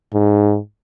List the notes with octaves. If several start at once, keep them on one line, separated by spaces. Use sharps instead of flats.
G#2